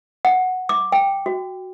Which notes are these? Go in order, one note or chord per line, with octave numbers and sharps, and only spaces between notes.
F#5
D6
G5
F#4